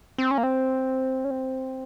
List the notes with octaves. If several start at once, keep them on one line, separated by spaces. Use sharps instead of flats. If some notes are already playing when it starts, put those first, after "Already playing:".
C4
C#4
A#3
C4
C#4
C4